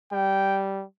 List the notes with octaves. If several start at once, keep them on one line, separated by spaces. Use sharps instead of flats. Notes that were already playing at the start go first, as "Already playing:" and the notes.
G3 G5